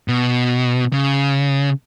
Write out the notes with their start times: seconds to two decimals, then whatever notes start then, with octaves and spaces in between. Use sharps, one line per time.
0.08 B2
0.93 C#3